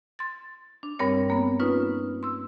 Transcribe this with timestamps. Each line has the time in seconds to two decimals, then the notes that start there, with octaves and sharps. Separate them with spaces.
0.19 C6 A6
0.83 D4
0.99 G2 G3 C4 A#4 C#5
1.30 A#3 B3
1.60 C#4 D#4 F4 B4
2.23 C6 E6